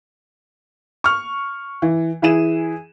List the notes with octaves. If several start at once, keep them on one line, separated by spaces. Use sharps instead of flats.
C#6 F6
E3
E3 E4 G#4 D#7 E7